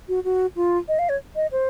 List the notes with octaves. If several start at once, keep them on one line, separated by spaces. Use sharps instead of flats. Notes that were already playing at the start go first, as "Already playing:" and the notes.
F#4
F#4
F4
D#5
F5
C#5
D#5
C5